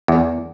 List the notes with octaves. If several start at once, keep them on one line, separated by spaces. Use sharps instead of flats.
E2